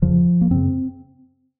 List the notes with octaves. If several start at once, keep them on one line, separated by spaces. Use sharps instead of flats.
F2 C#3 F3
A#3
F#2 C#3 C4